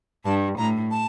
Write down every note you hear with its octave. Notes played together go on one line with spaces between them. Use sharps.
G2 A5
A2 A#5
A5